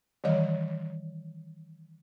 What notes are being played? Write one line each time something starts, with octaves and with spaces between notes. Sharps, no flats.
D#3 E3 G3 C#5 D#5